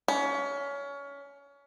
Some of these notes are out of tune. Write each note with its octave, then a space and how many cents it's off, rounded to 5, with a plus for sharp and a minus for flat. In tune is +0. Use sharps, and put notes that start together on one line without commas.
C#4 +25